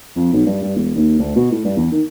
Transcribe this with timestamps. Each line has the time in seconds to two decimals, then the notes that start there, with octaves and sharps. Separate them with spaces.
0.16 F2
0.33 B1
0.46 G2
0.62 G2
0.76 E1
0.96 D#2
1.19 D2
1.36 B2
1.52 A2
1.65 G2
1.77 E2
1.92 D#3